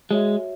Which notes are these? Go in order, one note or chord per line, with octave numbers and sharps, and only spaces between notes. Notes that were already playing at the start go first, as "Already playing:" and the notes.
G#3 F#4 C#5 E5